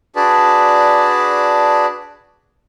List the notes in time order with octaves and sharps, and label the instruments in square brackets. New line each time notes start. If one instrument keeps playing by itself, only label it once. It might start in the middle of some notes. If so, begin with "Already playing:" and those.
[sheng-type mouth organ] D4 F#4 G#4 B4 D5 A5